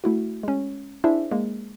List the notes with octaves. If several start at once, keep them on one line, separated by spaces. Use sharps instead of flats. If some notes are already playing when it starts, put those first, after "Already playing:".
A3 E4 F#4
G#3 C#4
D4 E4 G#4 C5 E5
G#3 A#3